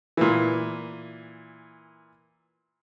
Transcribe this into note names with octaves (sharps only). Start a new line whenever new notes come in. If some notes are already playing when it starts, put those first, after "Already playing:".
A#2 E3